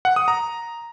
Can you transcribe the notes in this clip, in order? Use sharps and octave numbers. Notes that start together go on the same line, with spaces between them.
F#5
D#6
A#5